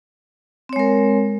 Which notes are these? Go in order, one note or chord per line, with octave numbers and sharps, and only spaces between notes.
G#3 C4 A#4 C#5